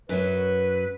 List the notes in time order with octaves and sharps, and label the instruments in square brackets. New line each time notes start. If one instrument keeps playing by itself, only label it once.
[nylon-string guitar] F#2 F#3 [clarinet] B4